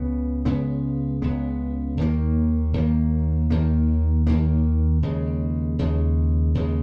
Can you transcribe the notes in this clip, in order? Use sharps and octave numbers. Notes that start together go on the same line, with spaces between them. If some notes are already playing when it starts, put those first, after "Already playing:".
Already playing: C#2 C#3 B3
C#2 C#3 G#3 B3
C#2 C#3 G#3 B3
D#2 D#3 A#3
D#2 D#3 A#3
D#2 D#3 A#3
D#2 D#3 A#3
D#2 C#3 G#3
D#2 C#3 G#3
D#2 C#3 G#3